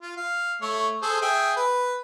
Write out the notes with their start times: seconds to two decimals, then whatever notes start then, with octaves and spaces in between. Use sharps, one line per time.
0.02 F4
0.17 F5
0.62 A3 C#5
1.02 G#4 A4 C5
1.22 G#4 E5 G5
1.57 B4